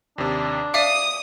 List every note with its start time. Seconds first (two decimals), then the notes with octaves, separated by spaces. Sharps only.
0.18 D#2 C3 D4
0.74 D5 E5 F5 D6 D#6